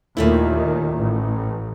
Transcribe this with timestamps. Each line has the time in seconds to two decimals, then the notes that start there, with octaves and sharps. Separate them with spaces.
0.17 D#2 A#2 D#3 A3 E4
0.96 A1